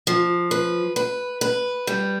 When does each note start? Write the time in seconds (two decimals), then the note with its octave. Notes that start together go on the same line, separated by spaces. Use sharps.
0.07 F3
0.51 B4
0.96 B4
1.41 B4
1.87 G3